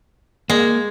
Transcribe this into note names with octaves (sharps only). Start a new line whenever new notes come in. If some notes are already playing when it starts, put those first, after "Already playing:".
G#3 A#3